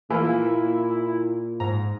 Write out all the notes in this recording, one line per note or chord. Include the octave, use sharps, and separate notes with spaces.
A#2 E3 A#3 E4 F4
G#2 A#5